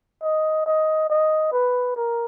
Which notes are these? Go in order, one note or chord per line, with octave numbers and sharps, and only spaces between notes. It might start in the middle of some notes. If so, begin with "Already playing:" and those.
D#5
D#5
D#5
B4
A#4